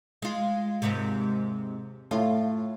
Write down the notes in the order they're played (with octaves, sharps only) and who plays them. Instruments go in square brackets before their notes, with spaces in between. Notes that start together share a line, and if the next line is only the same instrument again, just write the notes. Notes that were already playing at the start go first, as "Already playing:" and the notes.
[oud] G#3 F4
D#2 G#2 C3
[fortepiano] A2 [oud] F4